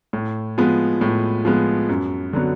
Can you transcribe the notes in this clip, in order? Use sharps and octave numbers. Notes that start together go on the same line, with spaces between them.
A2
F3 G#3 B3
A2
F3 G#3 B3
F#2
D3 F#3 B3